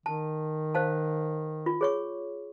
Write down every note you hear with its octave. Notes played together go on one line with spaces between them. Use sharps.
D#3 A5
C5 F5 A5
F4
G#4 C#5 C#6